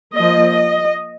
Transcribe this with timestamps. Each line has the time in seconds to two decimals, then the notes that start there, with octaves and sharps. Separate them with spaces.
0.16 F3 A#3 D#5
0.53 D#5